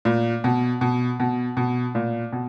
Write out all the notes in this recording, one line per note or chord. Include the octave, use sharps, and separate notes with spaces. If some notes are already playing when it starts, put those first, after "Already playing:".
A#2
B2
B2
B2
B2
A#2
B2